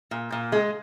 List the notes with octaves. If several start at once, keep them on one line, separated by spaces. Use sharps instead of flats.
A#2
A#2
G#3